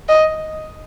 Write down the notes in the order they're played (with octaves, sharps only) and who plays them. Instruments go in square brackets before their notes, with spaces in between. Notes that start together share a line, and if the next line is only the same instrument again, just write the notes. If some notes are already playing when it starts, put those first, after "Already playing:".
[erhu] D#5